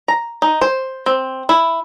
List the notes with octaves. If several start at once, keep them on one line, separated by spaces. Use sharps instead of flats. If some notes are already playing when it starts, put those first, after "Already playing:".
A#5
D#4
C5
C4
E4